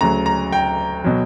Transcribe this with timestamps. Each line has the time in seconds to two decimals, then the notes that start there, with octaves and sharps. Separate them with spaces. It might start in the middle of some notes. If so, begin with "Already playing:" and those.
0.01 D2 C#3 F#3 A#5
0.26 A#5
0.53 G5
1.04 B2 F#3